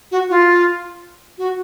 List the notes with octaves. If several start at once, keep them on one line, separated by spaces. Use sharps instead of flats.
F#4
F4
F#4